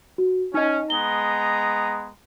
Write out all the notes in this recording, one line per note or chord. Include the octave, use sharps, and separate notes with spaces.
F#4
C#4 D#4 D#5
G#3 B3 A#5 G7